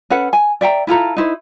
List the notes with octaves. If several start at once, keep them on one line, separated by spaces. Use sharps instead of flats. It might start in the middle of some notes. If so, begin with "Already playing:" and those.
C#4 A4 B4 F#5
G#5
D5 E5 G5 A#5
E4 F4 A4 A#5
D#4 E4 C5